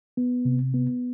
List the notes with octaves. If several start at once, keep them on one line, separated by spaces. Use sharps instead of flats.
B3
C3
B3